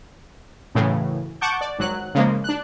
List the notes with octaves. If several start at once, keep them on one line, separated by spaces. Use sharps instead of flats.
F#2 A2 C#3 E3
F#5 A5 C#6 D6 G6
D5
G#1 F#3 F#6
C#3 F3 G#3 A#3
D4 F#6